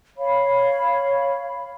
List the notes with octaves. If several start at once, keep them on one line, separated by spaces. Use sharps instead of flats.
C#5 F5 B5